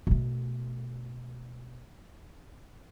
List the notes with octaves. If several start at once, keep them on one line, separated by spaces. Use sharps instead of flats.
B2 A3